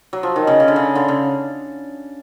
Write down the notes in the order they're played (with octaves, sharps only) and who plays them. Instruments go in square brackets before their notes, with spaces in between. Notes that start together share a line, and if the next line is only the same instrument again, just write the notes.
[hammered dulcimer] F#3
F3
D#3
C#3
C#3
D3
C#3
D3
C#3